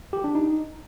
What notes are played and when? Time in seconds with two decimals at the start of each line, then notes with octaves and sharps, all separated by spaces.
0.13 G4
0.24 D4
0.35 D#4